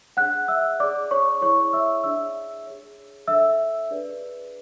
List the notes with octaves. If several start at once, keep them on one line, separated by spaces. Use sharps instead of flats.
D4 G#4 C#5 F#5 F#6
E5 E6
G#4 C#5 D5 D6
C#5 C#6
E4 G#4 C#5 D5 C#6
E5 E6
D4 G#4 D5 E5 E6
G#4 C#5
D4 A4 C#5 E5 E6
D4 G#4 B4 D5